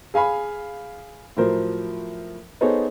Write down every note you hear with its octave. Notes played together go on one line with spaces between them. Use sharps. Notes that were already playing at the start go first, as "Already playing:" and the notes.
G#4 F5 G#5 B5
A2 F3 F#3 A#4 C5
B3 D#4 G#4 A4 C5 C#5